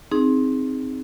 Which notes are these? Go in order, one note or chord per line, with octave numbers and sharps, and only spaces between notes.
C4 D#4 G#4